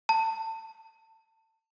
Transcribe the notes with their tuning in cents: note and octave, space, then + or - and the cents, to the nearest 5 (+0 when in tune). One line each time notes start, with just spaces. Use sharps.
A5 +25